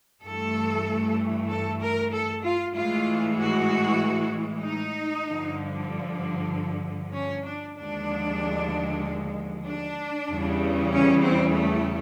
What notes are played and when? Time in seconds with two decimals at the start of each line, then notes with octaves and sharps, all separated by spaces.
0.23 G2 E3 A3 A4
1.48 A4
1.80 A#4
2.12 A4
2.43 F4
2.74 A2 E3 G#3 F4
3.37 F#4
4.63 D#4
5.26 G2 D3 F3
7.14 C#4
7.45 D4
7.76 D#2 D3 F3 G#3 D4
9.64 D4
10.27 E2 C#3 E3 G3
10.91 C#4
11.22 C4
11.53 A3